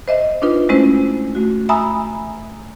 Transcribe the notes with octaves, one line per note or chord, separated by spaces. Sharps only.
C5 D#5 E5
D4 D#4 F4 B4
G#3 A3 C#4 E4 C5
A3 F#4
E5 G#5 A#5 B5 D#6 E6